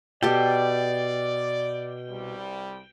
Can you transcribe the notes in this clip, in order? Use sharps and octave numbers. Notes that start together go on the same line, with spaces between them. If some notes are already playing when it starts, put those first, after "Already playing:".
B2 G4 A4 D5 G5
C2 G3